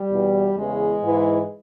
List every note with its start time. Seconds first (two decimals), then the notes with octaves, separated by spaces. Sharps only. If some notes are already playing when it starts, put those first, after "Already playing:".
Already playing: G3
0.11 E2 B2
0.56 E2 C#3 E3 G#3
1.02 G#2 E3